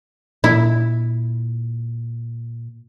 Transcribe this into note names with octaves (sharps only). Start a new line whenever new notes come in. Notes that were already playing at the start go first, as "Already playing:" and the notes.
A#2 E4